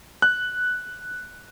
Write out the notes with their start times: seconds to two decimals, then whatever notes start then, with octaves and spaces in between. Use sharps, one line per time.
0.22 F#6